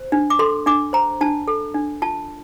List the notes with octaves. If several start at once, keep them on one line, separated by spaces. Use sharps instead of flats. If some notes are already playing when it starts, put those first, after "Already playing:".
Already playing: C5
D4
D6
A4 C6
D4 D6
C5 A#5
D4 A5
A4
D4
F4 A5